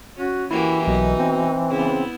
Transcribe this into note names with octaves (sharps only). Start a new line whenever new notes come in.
C#4 F#4
E3 A#3 E4 F#4 G4
B1 B2 D#4
C4
C#3 B3 E4